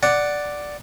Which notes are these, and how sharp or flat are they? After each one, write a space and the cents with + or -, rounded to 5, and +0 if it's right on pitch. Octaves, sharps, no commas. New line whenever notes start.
D5 +0 F#5 +0